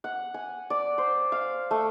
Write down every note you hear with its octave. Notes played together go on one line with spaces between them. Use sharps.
F#5
G#5
D5
C5
F5
A3